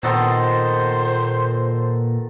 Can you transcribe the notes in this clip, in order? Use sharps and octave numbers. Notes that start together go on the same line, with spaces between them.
A#2 D#3 B3 A4 C5